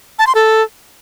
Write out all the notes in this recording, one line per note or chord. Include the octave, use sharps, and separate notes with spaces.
A5
C6
A4